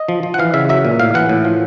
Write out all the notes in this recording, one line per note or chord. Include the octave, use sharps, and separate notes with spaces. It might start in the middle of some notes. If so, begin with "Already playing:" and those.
Already playing: D#5
F3
F3
F#5
E3 F5
C#3 E5
F#3 E5
A#2
A2 F5
E3 F#5
A2
F3